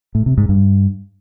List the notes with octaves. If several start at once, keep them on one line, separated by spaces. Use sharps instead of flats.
A2
C3
G#2
G2